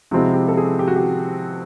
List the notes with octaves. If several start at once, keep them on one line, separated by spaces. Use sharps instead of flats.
C3 F3 G#3 C4 E4 F#4
G4
A4
G#4
G4
F#4
G4